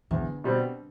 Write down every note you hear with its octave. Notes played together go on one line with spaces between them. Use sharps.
E2 D3
B2 G3 C4